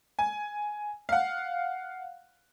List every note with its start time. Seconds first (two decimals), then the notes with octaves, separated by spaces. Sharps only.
0.19 G#5
1.09 F5 F#5